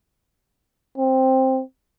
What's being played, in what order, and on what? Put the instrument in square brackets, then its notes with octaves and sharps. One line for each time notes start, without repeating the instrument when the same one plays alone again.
[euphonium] C4